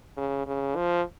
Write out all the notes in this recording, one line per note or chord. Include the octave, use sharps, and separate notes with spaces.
C#3
C#3
F3